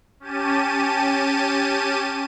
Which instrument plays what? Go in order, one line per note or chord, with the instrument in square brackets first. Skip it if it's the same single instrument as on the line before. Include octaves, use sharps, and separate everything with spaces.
[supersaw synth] C#4 G4 A5 D#7